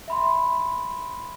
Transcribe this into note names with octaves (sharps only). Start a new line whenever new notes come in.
E5 B5 C6